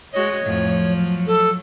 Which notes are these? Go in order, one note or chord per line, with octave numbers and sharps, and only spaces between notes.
G#3 F#4 C#5 D#5
F2 A2 F3
F#3
A4